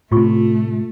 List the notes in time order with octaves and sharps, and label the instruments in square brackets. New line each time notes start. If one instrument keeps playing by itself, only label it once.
[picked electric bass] A2 C3 [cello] A3 [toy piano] F4 C#6